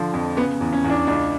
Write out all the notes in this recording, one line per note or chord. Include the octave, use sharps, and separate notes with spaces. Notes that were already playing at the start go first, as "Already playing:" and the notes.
Already playing: D3 F3
F2
C#3 B3
E2
C#4
E2
D4
C#2 D4